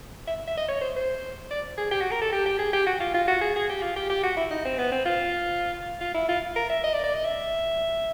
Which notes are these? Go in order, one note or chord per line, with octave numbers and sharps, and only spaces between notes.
E5
E5
D#5
C#5
C5
C5
D5
G#4
G4
F#4
A#4
A4
G4
G4
G#4
G4
F#4
F4
F4
F#4
G#4
G#4
G4
F4
G4
G4
F#4
E4
D#4
C4
B3
C4
F4
F4
E4
F4
A#4
E5
D#5
D5
D5
D#5
E5